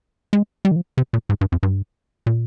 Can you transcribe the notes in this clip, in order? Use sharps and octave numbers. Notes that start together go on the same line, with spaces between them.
G#3
G3
D#3
F3
C3
A#2
G#2
G2
F2
G2
A#2